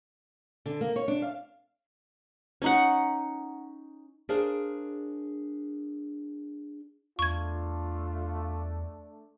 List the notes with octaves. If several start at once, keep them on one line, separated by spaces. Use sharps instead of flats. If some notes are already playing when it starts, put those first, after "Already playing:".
D3
A#3
C#5
D4
F5
C#4 D#4 F#5
D4 G#4 A#4 C5 F5
E2 A3 D4 F4 C#6 G#6